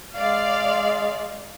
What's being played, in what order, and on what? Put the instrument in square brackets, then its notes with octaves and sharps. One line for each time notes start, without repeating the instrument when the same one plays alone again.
[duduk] G#3 [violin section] D5 F5